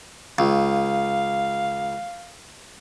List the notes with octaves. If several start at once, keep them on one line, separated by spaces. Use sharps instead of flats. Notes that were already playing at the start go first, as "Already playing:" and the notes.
C#2 F5